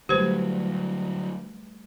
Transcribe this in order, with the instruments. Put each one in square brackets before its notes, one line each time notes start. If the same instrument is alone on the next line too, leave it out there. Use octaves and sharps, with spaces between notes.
[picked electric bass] D3 F#3 [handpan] G3 A3 B4 [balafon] G4 C5